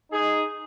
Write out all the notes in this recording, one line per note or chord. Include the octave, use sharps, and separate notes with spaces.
D#4 G#4